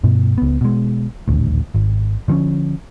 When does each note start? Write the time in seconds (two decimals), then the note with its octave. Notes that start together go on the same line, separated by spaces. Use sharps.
0.04 G2 B2
0.38 C#2 B3
0.61 B2 G#3
1.28 D#1 A1 D2
1.75 G#1
2.28 D3 F3 G#3 C#4